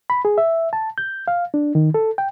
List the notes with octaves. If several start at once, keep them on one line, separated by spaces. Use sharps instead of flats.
B5
G#4
E5
A5
G6
F5
D4
D#3
A4
G5